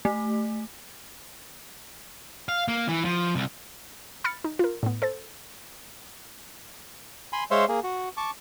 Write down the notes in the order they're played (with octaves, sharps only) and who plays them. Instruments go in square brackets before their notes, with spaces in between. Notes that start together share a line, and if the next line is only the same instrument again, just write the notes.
[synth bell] A3
[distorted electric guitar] F5
A#3
E3
F3
C2
[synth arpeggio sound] B5 F6 A6 C#7
D#4
F4 A#4
A2 B3
A4 C5 A6
[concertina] G#5 B5 C6
G#3 C5 C#5 E5 F5 C6
A#3 G#4
F#4
A5 C#6 D6